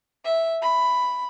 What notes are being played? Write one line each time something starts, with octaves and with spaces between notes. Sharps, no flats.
E5
B5